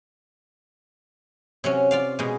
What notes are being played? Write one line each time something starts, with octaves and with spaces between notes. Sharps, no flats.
C3 F#3 C#4
F4 D5 F5
B2 G#3